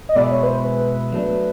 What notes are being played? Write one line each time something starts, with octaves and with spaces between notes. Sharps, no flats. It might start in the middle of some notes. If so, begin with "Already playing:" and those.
D#5
B2 G#3 B3 E4 D5
C#5
B4
C5
B4
F#3 A3 D4